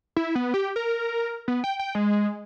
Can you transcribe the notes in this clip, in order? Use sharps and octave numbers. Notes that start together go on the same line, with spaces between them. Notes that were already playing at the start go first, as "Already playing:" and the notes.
E4
B3
G4
A#4
B3
G5
G5
G#3